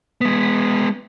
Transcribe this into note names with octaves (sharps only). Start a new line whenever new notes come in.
G#3 B3